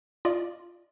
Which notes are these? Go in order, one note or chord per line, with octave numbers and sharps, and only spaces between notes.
F4 D5 D#5